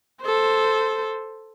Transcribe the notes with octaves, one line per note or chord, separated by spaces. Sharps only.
A4 C5